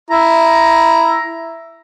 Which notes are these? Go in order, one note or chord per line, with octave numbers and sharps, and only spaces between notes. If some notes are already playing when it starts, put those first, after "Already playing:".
E4 A#5